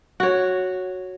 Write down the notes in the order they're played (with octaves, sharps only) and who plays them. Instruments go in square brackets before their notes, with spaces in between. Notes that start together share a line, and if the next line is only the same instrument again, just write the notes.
[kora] F#4 C#5